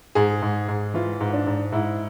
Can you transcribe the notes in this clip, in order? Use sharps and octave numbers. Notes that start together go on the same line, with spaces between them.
G#2 G#4
G#2
G#2
E3 F4
G#2
D4
G#2
G#2 E4